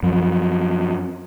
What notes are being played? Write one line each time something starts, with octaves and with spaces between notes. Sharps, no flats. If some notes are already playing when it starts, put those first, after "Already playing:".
F#2 F3